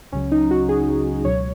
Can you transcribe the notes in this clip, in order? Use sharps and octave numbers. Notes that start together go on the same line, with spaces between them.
C#2 C#3 F#3 C#4
D#4
F#4
G#4
C#2 B2 F#3 C#5